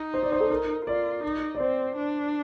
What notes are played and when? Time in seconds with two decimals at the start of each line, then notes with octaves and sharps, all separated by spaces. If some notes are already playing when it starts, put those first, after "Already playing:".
Already playing: D#4
0.14 C5
0.23 D5
0.32 C5
0.40 A4
0.50 A#4
0.86 F4 D5
1.24 D#4
1.55 D5
1.60 C4 C5
1.97 D4